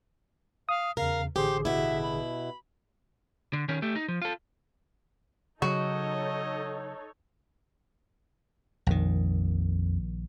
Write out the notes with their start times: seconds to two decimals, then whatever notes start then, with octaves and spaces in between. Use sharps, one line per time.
0.69 F5 D#6
0.97 E2 C#3 A#4 F5
1.36 A1 D3 G4 G#4 C5
1.65 B2 E4 E5
2.02 B5
3.53 D3
3.68 D#3 C#4
3.82 A3 G4
3.96 D#4
4.08 F3
4.22 F4 A4
5.62 C#3 F#3 D#4 F#4 A4 C#5 D#5
8.87 A#1 F2 D#3